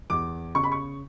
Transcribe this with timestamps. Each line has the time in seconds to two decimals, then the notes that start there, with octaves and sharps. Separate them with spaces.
0.10 E2 D6
0.55 C#3 C#6
0.64 B5
0.72 C#6